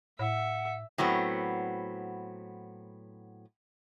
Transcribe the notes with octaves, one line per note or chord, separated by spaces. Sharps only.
A2 E5 F#5
A2 F#3 B3 C4